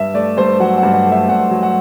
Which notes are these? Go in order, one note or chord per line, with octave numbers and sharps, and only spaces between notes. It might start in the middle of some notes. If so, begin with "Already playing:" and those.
Already playing: G2 E5
A3 D5
G2 C5
F#3 F#5
F#5
G2
F#5
A3
E5
G2 F#5
F#3
F#5